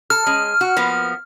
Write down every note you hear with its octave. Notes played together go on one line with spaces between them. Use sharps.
A4 F6
G#3 C#4
F#4
F3 A#3 B3